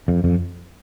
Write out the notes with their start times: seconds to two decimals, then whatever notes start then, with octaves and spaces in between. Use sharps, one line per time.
0.08 F2
0.24 F2